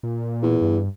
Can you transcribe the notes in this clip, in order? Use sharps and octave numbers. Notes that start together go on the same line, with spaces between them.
A#2
E2
G2